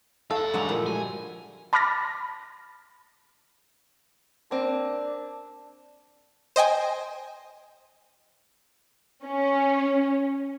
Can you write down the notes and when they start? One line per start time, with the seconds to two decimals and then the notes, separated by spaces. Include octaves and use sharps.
0.31 A3 A4 F5 G5
0.54 G2 D3 F#3 G#3 D6 F7
0.69 A#2 F3 F#3 A3 E4 F4
0.86 G3 G#3 G#5
1.73 A5 B5 D6 F6 A6 A#6
4.51 A#3 C4 D4
6.56 C5 D#5 G5 G#5
9.25 C#4